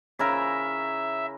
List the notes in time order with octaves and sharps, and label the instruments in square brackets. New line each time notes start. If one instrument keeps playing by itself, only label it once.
[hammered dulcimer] C#3 E4 A#4 [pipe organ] E5